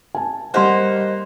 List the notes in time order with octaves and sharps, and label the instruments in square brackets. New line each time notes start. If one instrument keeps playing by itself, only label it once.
[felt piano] G#5 A5
[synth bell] G3 G4 F#6 [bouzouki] A#3 D#4 C5 [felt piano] F#5 C6